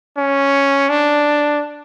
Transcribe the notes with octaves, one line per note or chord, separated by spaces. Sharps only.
C#4
D4